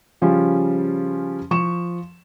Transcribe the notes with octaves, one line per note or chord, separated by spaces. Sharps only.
C#3 F3 G3 C#4 F4
F3 C#6 E7